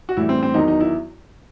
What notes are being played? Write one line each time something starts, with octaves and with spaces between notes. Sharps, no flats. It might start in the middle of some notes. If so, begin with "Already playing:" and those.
F#4
A2 E3 G3 E4
C4
C4
E2 D#3 F#3 D#4
D#4
E4